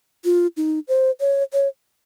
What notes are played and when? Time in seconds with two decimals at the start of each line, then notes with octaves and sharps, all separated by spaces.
0.25 F4
0.57 D#4
0.88 C5
1.21 C#5
1.53 C#5